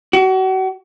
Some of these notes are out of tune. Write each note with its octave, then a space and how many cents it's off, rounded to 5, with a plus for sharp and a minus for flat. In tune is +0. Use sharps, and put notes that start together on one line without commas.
F#4 +35